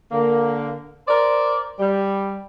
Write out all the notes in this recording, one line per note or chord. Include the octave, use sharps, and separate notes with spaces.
D3 A#3
A#4 C5 D5
G3